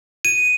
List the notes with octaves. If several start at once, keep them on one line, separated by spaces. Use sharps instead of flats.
D#7